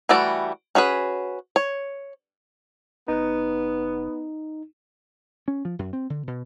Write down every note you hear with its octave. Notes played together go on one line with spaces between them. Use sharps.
E3 G3 A3 F#4 D5
C#4 F#4 G#4 B4
C#5
F1 B3 D#4
C#4
F3
F#2
C4
D3
B2